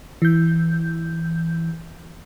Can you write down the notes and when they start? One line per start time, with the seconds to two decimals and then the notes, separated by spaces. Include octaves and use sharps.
0.22 E3 G6